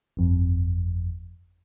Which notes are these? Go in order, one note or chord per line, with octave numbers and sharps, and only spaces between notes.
G1 F2